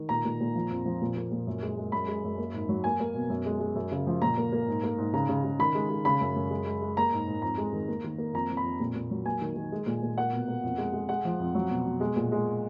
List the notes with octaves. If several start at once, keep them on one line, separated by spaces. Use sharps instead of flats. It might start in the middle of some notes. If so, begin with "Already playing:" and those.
Already playing: D#3
A#2 A#5
A#2
A#2
F3
F2
F3
A#2
A#3
A#2
F#2
G#3
G#3
F#2 B5
G#3
F#2
A#3
G#2
F#3
A#3 G#5
A#3
B2
F#2
G#3
G#3
F#2
C#3
F3
A#2 A#5
A#3
A#3
G#2
A#3
G#2
C#3 A#5
C#3
C#3
D#3 B5
G#3
G#3
C#3 B5
F#2
F#2
G#3
G#3
G#3
A#3 A#5
G#2
G#2
F2 A#5
G#3
D#3
A#3
D#3
A#3
F2 A#5
F2
B5
F2
A#2
A#2
F#3
A#3 G#5
D#3
D#3
G#3
A#2
A#2
A#3 F#5
B2
A#3
F2
G#3
G#3
G#3 F#5
F3
F2
F#3
B2
B2
G#3
A#2
G#3